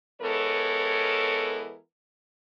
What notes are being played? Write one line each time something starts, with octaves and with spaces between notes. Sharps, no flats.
E3 G#3 B3 A4 A#4 C#5